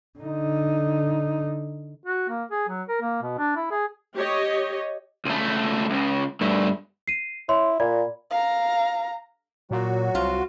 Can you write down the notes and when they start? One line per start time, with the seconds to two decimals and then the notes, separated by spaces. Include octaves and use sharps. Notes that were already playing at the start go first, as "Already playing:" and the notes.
0.19 D3 D#4
2.06 F#4
2.29 A#3
2.51 G#4
2.69 F#3
2.88 A#4
3.02 A#3
3.23 B2
3.38 D4
3.56 E4
3.71 G#4
4.16 G4 C#5 D#5
5.26 C#2 A3
5.90 C#2 C#3
6.41 G2 A3
7.08 C7 D#7
7.49 E4 C#5 C6
7.80 A#2 D5 B5
8.31 F5 A#5
9.71 A#2 F#3 F#4
10.15 C2 F4